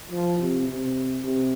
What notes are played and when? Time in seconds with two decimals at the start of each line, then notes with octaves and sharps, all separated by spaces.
0.11 F3
0.40 C3
0.68 C3
1.24 C3